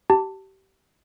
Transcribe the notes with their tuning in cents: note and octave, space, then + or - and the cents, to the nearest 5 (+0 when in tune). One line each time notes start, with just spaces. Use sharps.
G4 -30 A5 +20